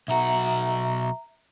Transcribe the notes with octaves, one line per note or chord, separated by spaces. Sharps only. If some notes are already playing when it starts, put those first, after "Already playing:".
B1 F#4 E5 A#5